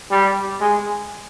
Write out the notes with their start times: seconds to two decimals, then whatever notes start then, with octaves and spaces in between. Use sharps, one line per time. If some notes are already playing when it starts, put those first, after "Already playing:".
0.11 G3
0.61 G#3